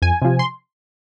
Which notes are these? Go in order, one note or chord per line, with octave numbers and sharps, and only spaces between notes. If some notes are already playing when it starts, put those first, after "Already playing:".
F2 G#5
C3 F3
C6